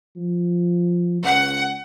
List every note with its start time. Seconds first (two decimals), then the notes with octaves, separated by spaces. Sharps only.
0.16 F3
1.23 C#2 F#5